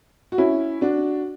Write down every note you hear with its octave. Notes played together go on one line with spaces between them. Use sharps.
F#4
C#4 E4
D4 F#4